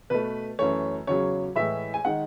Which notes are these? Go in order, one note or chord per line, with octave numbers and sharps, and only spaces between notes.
B2 A3 B4
F#2 E3 A3 C#5
E2 C#3 F#3 C#5
A2 E3 G#3 E5
G#5
D#3 G#3 F#5